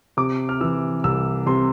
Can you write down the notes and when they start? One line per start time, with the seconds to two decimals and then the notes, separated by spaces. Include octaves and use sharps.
0.17 C3 D6
0.49 F6
0.61 E3 E6
1.04 C2 E6
1.47 C3 C6